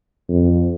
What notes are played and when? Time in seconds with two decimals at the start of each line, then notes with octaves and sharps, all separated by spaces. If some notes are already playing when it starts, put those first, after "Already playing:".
0.29 F2